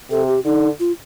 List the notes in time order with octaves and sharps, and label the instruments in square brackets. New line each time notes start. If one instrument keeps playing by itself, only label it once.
[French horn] C3 [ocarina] A4
[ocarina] G4
[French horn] D3 [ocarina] D#4
[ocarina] F4